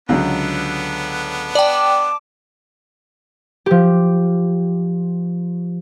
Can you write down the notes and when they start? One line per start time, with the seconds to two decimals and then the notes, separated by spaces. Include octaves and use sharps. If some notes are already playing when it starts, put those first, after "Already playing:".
0.09 C#2 D3 F#3 B3 D4
1.55 D5 G5 A5 D6
3.66 F3 G4